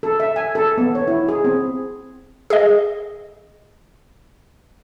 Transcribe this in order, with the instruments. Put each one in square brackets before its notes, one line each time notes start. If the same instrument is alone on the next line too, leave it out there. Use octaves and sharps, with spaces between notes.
[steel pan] A4
E5
G#5
A4
B3
C#5
E4
G#4
C4
[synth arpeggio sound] G#4 D#5